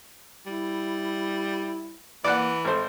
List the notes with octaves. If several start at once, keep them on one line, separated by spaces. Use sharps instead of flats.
G3 E4
E3 A#3 D5 F#5
G#1 A4 C5